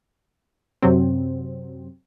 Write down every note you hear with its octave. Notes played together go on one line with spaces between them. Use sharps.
F#2 C3 F#3 C4